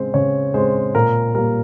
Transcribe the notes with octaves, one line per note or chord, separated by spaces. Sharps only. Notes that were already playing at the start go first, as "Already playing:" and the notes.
Already playing: C#3 G#3 C4 C5
C#3 C#5
G#3 C4 C5
A#2 A#4
G3 A#3 A#4